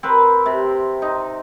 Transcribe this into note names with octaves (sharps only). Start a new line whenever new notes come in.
C4 A#4 B4
C3
D#4